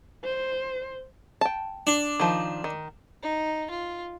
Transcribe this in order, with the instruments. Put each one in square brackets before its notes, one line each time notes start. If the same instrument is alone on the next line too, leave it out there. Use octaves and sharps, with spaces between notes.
[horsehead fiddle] C5
[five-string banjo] G5 A5
[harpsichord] D4
[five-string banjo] D#3 F3
D#3
[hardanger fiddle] D#4
F4